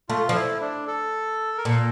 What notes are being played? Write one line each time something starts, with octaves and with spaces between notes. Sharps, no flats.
A3 F4
F3
E4
D4
A4
A#4
A#2 A4